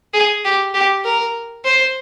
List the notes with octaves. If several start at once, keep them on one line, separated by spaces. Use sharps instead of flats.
G#4
G4
G4
A#4
C5